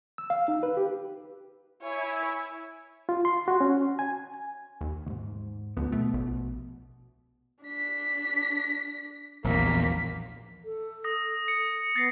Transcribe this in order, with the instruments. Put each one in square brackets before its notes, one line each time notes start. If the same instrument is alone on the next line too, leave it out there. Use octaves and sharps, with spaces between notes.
[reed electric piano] E6
F5
D#4
B4
G4
[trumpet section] E4 [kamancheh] C#5 G#5
[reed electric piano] F4
C6
F#4
C#4
G#5
[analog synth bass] D#2
[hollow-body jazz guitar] D2 G#2
[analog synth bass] D2 [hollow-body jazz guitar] F3 B3
[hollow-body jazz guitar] B2 [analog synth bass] A3
[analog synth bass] A#1
[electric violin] D4 B6
[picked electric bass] A#1 E2 [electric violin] A#3 B6
[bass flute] A4
[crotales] D#6 A#6
C#7
[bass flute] B3 [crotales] A6 A#6 C7